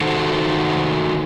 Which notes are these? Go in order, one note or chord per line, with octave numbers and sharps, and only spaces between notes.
D#3 D#4 F#4 A4 C5